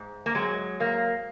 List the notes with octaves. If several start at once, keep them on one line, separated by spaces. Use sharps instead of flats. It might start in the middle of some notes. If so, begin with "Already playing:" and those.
Already playing: G#2
A#3
F#3 G#3
G#2 A#3